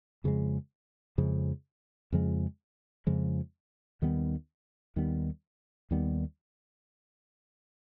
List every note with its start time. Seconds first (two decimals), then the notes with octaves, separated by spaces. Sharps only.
0.24 F2 C#3 F3 G#3
1.18 F2 C#3 F3 G#3
2.12 F2 C#3 F3 G#3
3.07 F2 C#3 F3 G#3
4.02 D#2 D#3 G3 B3
4.96 D#2 D#3 G3 B3
5.91 D#2 D#3 G3 B3